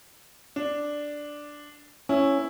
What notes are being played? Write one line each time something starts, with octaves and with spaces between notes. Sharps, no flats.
D4
C#4 E4